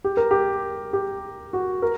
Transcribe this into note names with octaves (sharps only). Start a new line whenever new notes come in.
G4
A#4
G4
G4
F#4
A#4